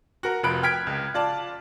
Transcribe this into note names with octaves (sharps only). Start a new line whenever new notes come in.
F#4 A#4 A#5
F1 F3 B5 F#6 D7
G5 F6 G#6 B6 D7
C#2
F4 D5 A5